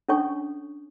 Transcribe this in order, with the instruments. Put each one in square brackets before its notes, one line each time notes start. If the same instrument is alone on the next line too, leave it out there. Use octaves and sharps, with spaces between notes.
[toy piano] C#4 D4 A4 C#5 G#5 C#6